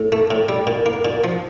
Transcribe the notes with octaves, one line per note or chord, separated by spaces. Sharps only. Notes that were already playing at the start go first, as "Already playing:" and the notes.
Already playing: A2
A3
A2
G3
A#2
A#3
A#2
F3